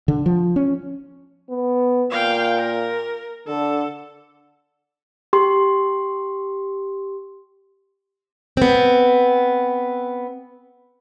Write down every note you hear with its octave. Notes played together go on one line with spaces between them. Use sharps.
D3
F3
C#4
B3
A#2 F5 G5
A#4
D3 A4
G4 C6
B3 C4